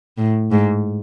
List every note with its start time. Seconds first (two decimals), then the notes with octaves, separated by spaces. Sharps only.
0.17 A2
0.51 G#2